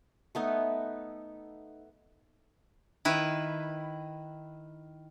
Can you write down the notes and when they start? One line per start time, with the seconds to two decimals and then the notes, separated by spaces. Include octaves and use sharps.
0.35 A3 B3 D#4
3.05 D#3 E4 B4